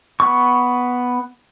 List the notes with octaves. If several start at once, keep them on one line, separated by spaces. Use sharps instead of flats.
B3 C#6